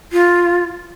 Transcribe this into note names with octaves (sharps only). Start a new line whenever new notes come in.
F4